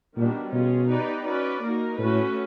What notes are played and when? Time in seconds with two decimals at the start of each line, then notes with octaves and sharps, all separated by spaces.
0.17 A#2 D#3 G3 B3 D4 F#4
0.53 B2 C#4 F4 G#4
0.90 B3 D#4 G4 B4 D5
1.25 C#4 F#4 B4 D5
1.62 A#3 D#4 F#4 A#4
1.98 A2 A3 C#4 F#4 B4